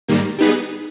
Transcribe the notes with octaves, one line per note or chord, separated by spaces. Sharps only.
G#2 D#3 G3 A#3
G3 B3 D#4 G#4 B4